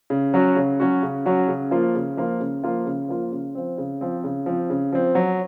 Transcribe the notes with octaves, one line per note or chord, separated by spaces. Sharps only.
C#3
F#3 C#4 F#4
C#3
F#3 C#4 F#4
C#3
F#3 C#4 F#4
C#3
F3 A#3 F4
C#3
F3 A#3 F4
C#3
F3 A#3 F4
C#3
F3 A#3 F4
C#3
F3 C4
C#3
F3 C4
C#3
F3 C4
C#3
F3 C4
F#3